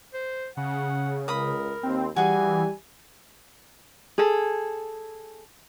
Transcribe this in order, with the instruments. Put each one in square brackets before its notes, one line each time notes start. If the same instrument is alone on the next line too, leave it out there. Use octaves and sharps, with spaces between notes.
[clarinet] C5
[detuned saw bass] C#3 [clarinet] F#5
[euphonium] C#2 [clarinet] A#4 [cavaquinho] B5 D#6
[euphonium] D#2 [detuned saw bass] C4
[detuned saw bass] E3 [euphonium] G3 [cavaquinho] F#4 G#4 [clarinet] G#5
[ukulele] G#4 A4